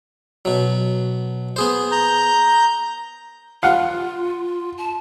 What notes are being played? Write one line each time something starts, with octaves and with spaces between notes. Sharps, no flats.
B2 F#3
B3 G#4 C5
A#5 G6
F4 F5 F#5
A5